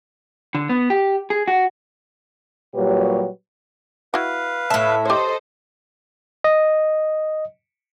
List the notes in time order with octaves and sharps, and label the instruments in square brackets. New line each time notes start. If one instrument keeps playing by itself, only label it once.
[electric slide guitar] D3
B3
G4
G#4
F#4
[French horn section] A#2 F#3 G3 G4 B4 C#5
[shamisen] E4 F#4 [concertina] B4 F5
[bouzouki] A2 E5 [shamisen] A5
[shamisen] G4 C#5 [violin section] A4 C5 D#5
[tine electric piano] D#5